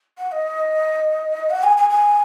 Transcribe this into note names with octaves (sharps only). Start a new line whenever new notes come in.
F#5
D#5
F#5
G#5
G#5
G#5